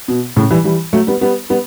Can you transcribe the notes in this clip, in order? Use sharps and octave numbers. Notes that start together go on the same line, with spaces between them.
B2
A2 C#3
E3 G3
E3 G3
F#3 A3
G3 B3
G3 B3
G3 B3